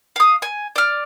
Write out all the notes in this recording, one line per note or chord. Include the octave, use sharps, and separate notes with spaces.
F5 D#6
G#5
D5 F6